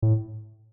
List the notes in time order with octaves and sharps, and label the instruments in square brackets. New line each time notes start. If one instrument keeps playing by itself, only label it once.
[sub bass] A2